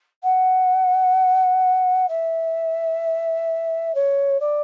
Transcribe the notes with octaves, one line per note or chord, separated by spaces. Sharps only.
F#5
E5
C#5
D5